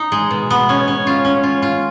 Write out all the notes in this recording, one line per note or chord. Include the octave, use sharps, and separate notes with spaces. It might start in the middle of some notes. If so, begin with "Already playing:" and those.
Already playing: D#4
G#3
B2
B3
C#4
C#4
F4
C#4
F4
F4